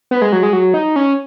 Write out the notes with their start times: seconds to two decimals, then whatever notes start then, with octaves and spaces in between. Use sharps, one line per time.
0.11 B3
0.22 G#3
0.32 F#3
0.43 G#3
0.53 F#3
0.74 D#4
0.96 C#4